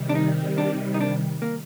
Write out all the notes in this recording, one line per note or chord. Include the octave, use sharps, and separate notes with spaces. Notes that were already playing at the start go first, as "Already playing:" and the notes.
Already playing: C3 D#3 G3
D4
D#4
D4
D#4
D4
A#3